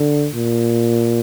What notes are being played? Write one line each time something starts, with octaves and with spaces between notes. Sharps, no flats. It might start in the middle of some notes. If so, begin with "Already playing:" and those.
Already playing: D3
A#2